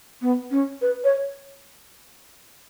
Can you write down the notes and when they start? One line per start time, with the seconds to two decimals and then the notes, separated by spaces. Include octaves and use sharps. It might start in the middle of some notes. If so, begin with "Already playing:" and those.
0.22 B3
0.51 C#4
0.81 B4
1.04 C#5